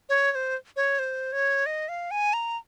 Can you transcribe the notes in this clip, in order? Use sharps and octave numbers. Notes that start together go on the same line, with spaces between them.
C#5
C#5
C5
C#5
C5
C#5
D#5
F5
G#5
A#5